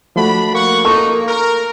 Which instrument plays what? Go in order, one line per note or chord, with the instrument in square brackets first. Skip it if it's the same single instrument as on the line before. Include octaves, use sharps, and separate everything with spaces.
[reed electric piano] F3 A3 F#4 [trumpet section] D4 B5
[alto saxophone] A#3 [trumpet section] F#5 C#6
[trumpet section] D#4 [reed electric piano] A4 [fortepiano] C#6
[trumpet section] A#4